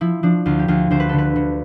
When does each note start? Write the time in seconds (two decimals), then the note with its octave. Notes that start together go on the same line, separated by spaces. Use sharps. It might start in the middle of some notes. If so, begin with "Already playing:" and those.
0.01 F3 E4
0.23 F3 D4
0.46 D2 F4
0.59 G4
0.68 D2 F4
0.91 D2 C5
1.00 B4
1.09 D3 A4
1.18 B4
1.36 D3